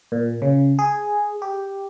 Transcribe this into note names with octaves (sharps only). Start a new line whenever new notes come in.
A#2
C#3
G#4
G4